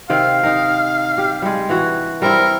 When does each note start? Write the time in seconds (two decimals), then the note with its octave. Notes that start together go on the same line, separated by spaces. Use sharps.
0.10 C3 D#3 F5 G5
0.43 D#4 A#4
1.18 G4
1.42 G3 G#3
1.69 E3 F#4 F#5
2.22 G3 C4 E4 A#4